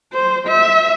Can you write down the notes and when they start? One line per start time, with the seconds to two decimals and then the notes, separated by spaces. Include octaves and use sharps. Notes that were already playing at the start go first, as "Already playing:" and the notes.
0.13 C5
0.47 E5